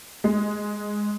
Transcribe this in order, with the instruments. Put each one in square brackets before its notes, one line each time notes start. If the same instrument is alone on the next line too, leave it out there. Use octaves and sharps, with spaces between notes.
[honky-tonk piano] G#3